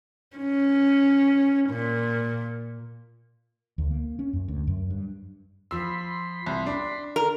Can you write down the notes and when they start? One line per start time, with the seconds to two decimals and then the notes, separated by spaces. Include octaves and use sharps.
0.37 C#4
1.69 A#2
3.78 D2
3.91 A#3
4.19 C#4
4.33 F#2
4.48 D2
4.67 F#2
4.90 G2
5.71 F3 B5 C6 E6
6.47 C2
6.66 D4
7.16 A#4